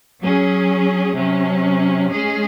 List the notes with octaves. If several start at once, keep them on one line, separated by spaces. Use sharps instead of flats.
F#3 C#4 G#4
C3 F#3 C#4
G#3 C#4 G#4